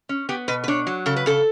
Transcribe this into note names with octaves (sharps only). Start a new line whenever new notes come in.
C#4
B3 G4
B2 B4
B4
D4 C#5
F#3
C#3 A4
B4
C#3 A4